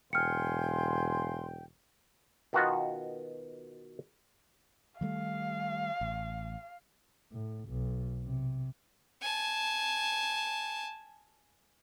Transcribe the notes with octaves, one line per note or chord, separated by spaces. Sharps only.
E1 F5 G5 G#5 C6 F6 C#7
B2 D#3 B3 F4 F#4
D#3 G3 A3 F5
A1
A2
B1
C3
G#5 A5